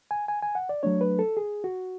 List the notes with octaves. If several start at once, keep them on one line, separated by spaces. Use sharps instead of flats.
G#5
G#5
G#5
F#5
D5
F#3 A3 D4 C#5
B4
A4
G#4
F#4